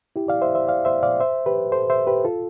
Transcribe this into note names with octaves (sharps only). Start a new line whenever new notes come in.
E4 G4
D5 F5
C5 E5
C5 E5
D5 F5
C5 E5
D5 F5
C5 E5
G4 B4
A4 C5
C5 E5
G4 B4
F4 A4